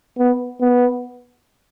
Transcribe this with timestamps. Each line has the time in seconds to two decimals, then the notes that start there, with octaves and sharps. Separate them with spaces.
0.18 B3
0.60 B3